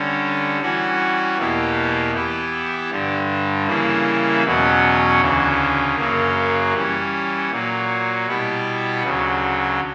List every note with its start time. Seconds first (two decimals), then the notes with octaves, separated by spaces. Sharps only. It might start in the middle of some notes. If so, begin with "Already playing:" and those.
Already playing: D3 G3 C#4
0.61 E3 G3 C#4 F#4
1.38 E2 B2 A#3 E4 G4
2.13 E3 B3 E4 G4
2.91 G2 D3 G3
3.67 C#3 E3 G3 A#3 E4
4.44 E2 B2 F#3 C#4
5.20 D2 C#3 E3
5.97 F#2 C#3 F#3 A#3
6.74 E3 G3 C#4
7.50 A#2 F#3 A#3
8.27 B2 G3 B3 E4 G4
9.03 D2 C#3 F#3